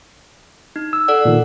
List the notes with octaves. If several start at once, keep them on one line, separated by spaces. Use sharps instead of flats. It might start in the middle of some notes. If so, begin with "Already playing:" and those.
D#4
E6
A4 D5 F#5
A#2 D#3